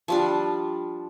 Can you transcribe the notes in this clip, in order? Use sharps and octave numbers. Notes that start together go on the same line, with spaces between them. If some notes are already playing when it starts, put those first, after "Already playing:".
F3 G3 D4